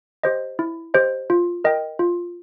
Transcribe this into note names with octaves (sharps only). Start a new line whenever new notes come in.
G4 C5 D#5
E4
G4 C5 D#5
F4
A#4 D#5 G5
F4